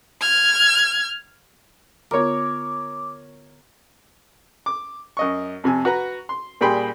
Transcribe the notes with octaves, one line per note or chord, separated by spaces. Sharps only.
F6 G#6
D3 B3 F4 A#4 C#5 D6
D6
F#2 D#5 C#6
F2 C3 G#5
F#4 B4 A#5
C6
A#2 G3 G#4 G5 B5 C6